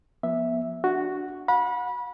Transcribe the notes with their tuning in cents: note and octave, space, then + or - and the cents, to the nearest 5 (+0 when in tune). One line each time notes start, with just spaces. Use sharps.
F3 +0 B3 -30 E5 +0
D4 +0 F#4 +0
F#5 -35 B5 -25